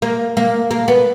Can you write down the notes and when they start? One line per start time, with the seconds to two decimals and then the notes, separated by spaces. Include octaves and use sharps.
0.02 A#3
0.37 A#3
0.71 A#3
0.88 B3